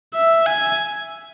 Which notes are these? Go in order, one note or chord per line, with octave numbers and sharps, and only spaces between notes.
E5
G#5